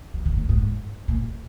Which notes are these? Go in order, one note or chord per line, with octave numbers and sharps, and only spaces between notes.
F3
D#3
C#3
G#2
A#2